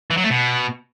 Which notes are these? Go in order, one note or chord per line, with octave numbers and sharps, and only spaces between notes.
E3
F#3
A3
B2